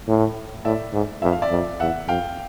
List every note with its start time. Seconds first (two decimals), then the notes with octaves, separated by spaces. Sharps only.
0.08 A2
0.65 A2 D5 E5
0.93 G#2
1.22 F2 E5
1.32 F5
1.42 D5 E5
1.51 F2
1.80 E2 E5 F#5
2.08 F2 F5 G5